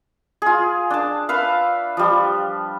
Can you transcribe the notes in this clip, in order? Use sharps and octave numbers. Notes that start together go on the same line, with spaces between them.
F4 G#4
D4 A5
B4 E5 F5
F3 G3